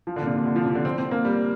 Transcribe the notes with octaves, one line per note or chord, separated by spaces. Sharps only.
F3
D3
A#2
C3
A#2
D3
F3
C3
D3
C4
C4
A#3
G3